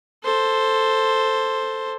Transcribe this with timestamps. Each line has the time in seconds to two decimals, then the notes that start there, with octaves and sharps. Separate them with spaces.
0.23 A4 C5